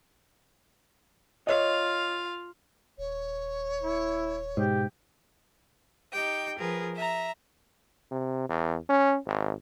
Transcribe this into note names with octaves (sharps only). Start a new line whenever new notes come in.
F4 C#5 D#5 F5
D#1 C#5
E4
G#2 B2 G4
D#4 G4 G5
F3 G#4 A#4 B4
E5 A#5
C3
E2
C#4
G#1